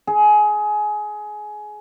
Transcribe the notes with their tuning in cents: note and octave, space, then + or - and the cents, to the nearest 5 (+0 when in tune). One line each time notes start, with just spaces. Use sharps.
G#4 +20